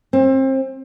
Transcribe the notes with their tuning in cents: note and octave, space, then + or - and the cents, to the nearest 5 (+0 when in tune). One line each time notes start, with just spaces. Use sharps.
C4 +30